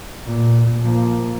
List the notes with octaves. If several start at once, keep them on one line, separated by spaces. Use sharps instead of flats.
A#2
F3 A#3